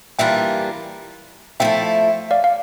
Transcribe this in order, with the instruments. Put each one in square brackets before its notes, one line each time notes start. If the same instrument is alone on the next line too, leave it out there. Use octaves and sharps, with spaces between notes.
[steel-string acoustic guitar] E3 G3 A#3 D4 F4 [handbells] E5 G5
[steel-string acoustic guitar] F3 A3 E4 [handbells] E5 G5
[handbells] D5 F5
F5